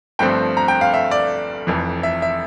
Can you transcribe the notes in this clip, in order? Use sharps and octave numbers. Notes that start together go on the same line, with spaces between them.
G1 G2 F3 A3 C4 G5
A#5
G5
F5
E5
D5
F1 F2 E3
E5
E5